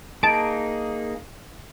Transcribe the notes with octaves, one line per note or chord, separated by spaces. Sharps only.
A#3 D#4 G#4 A5 D7